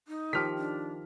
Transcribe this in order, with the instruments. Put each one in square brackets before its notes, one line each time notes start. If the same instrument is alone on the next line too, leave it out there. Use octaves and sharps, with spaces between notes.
[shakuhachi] D#4
[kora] D#3 F3 G4 [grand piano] F6 B6
[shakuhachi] D4